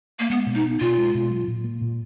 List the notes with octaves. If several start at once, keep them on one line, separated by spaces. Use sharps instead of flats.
A#3
G#3 B3
B2
D#4
B3
B2 F4
G#3
B2
F#3
A#2
A#3
A#2